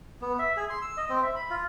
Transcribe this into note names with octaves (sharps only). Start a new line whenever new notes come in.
B3
E5
G#4
C6
E6
D#5
C4
E5
B5
F4